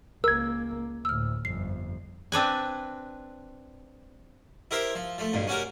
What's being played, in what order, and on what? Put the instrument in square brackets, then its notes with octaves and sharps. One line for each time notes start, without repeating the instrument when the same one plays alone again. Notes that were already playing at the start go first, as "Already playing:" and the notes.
[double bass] C#2 A#3 [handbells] A#4 G#6 [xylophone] E6
[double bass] D2 A2 [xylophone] E6 F6
[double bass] G1 F2 [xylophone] C7
[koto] C4 D4 B4 G#5
[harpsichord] E4 G4 A#4 C5 E5
F3
F3 A3
B1 G2 A#2
C#4 F#4 G4 A#4